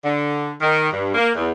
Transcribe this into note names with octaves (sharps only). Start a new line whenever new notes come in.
D3
D#3
G2
A#3
E2